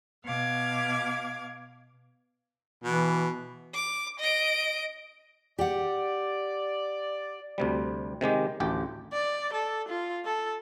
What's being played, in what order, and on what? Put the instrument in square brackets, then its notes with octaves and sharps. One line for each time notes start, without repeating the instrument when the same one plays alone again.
[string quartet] B2 F5 D6 G#6
[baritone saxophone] B2 [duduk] E3
[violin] D6
D#5 D7
[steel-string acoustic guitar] G4 F#5 [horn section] D5
[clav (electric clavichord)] D2 C3 G3
C3 D#3 G#3 G4
A1 D2 G4 G5
[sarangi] D5
A4
F4
A4